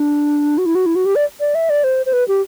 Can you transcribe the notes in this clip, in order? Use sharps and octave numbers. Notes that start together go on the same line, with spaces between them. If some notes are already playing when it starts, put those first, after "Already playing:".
Already playing: D4
F#4
E4
F#4
E4
F#4
G4
D5
D5
E5
D5
C5
C5
B4
G4